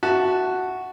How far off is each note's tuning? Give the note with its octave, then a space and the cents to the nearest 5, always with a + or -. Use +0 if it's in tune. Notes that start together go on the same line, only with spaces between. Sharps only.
F#4 +0 E5 +0 A5 +0